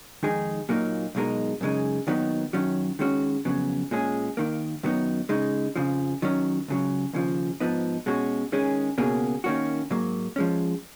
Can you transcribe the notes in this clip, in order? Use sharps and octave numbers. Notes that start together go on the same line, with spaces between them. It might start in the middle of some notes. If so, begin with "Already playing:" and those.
F2 D#3 G#3 D#4 G#4
A#2 F#3 A#3 D#4
B1 B2 G#3 D#4 A#4
F#2 C#3 G#3 D#4
D#2 D#3 F#3 B3 D#4
F#2 D#3 F#3 C#4
D#3 G#3 C#4 F#4
F2 C#3 F#3 B3
A#2 G#3 C#4 G#4
D#2 D#3 A#3
F#2 D#3 F#3 B3 D#4
C#3 G#3 D#4
F2 C#3 F3
D#3 F#3 C#4
C#2 C#3 F#3
D#2 C#3 F3
G#2 F3 B3 D#4
B2 G#3 C#4 F#4
D#3 G#3 C#4 G#4
C#2 B2 A#3 C#4 G#4
D#3 A#3 C#4 F#4
G#2 F#3 A#3
F3 G#3 C#4